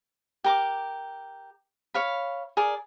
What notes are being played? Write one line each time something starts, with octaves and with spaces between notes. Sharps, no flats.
G4 A#4 D6
C#5 F5 B5
G#4 A#4 D5